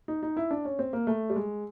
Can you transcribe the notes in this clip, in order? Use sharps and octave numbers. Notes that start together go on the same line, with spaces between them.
D#4
D#4
E4
D4
C#4
C4
A#3
A3
G3
G#3